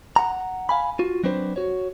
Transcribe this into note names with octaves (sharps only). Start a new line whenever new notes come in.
F#5 A#5
F5 G#5 B5
F4 F#4
F#3 C4 D4 B4 C5
F#4 C#5